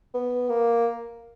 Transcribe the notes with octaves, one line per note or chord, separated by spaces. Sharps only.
B3
A#3